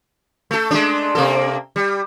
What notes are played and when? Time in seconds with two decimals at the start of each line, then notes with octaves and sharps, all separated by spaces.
0.51 A3 A4
0.71 G#3 A3 D4
1.15 C3 A#3 A4
1.76 G3